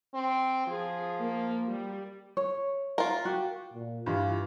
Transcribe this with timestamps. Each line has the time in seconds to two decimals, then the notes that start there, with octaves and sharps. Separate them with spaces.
0.14 C4
0.67 F3 G#4
1.20 A#3
1.68 G3
2.37 C#5
2.98 F4 A#4
3.25 F#4 G4
3.74 A#2
4.06 G2 E3 F4